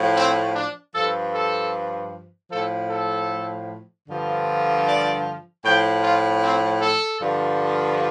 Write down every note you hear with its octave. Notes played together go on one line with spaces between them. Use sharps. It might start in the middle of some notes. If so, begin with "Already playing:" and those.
Already playing: A2 F3
C4
D4
G2 F3 A4
A4
A2 F3 A4
A4
G2 D3 F3
D5
A2 F3 G5
F4
C4
A4
G2 D3 F3